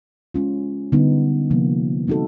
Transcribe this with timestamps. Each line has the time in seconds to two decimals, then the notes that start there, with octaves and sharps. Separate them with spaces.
0.34 G#3 C#4 F4
0.92 D3 G3 B3 D#4
1.50 C3 F3 A#3
2.07 G#3 C4 D#4 F#4 A4